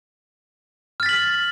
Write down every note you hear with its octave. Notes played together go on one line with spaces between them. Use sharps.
F6 A6 B6 F#7